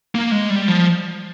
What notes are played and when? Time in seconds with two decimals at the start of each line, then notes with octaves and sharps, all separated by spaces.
0.15 A#3
0.32 G#3
0.50 G3
0.68 F3